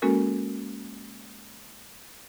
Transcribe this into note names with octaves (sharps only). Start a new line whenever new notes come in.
G#3 A#3 C#4 F#4 A4 A#4